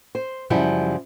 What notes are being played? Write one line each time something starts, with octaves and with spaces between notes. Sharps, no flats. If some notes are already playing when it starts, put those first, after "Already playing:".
C5
F#2 C#3 F3 G3 E4